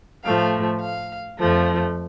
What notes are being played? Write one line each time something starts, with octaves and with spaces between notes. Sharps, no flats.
A2 F3 A3 F5
F5
F2 F3 A3